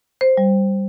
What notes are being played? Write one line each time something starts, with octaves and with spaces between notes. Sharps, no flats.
C5
G3